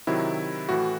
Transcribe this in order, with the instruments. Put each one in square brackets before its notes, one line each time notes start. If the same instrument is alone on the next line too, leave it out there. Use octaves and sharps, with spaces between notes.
[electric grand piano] C3 D#3 F#3 E4
A2 E3 F#4